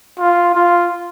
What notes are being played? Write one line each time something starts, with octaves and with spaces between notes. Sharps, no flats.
F4
F4